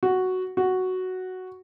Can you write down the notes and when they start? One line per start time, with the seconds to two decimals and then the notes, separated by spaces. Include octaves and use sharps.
0.03 F#4
0.57 F#4